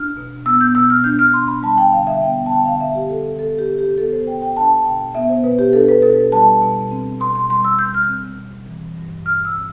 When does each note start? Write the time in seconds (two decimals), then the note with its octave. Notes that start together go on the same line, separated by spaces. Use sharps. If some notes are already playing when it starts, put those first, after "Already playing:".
Already playing: D4 F6
0.17 B2
0.46 B3 E6
0.61 G6
0.75 B2 E6
0.90 F6
1.04 D4 G6
1.19 F6
1.34 B2 C6
1.48 B5
1.63 G3 A5
1.78 G5
1.92 D3 F5
2.07 E5
2.21 B3 G5
2.46 A5
2.50 D3 G5
2.65 F5
2.81 G3 E5
2.95 G4
3.10 D3 A4
3.39 B3 A4
3.59 G4
3.68 D3
3.79 G4
3.98 B3 A4
4.12 C5
4.27 B2 G5
4.42 G5
4.57 D4 A5
4.85 B2 G5
5.15 B3 E5
5.29 C5
5.44 B2 B4
5.59 G4
5.73 D4 A4
5.89 B4
6.03 B2 A4
6.32 G3 A5
6.62 B2
6.91 C4
7.21 B2 C6
7.35 C6
7.50 G3 C6
7.64 E6
7.79 B2 G6
7.94 F6
8.09 C4
8.38 B2
8.67 E3
8.97 G2
9.26 G3 F6
9.45 E6
9.55 C4